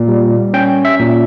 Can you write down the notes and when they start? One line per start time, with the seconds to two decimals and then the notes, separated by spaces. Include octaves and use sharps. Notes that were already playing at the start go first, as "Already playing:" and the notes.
Already playing: A#2
0.08 G3
0.54 C#4 G5
0.85 E5
1.00 A#2